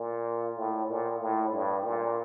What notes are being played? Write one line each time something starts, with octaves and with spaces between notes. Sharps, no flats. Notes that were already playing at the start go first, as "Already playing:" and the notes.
Already playing: A#2
A2
A#2
A2
G2
A#2